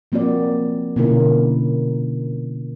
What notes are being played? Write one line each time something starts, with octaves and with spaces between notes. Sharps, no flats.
F3 A#3 C4 F#4 D5
B2 D3 A#3 C#4 E4 A#4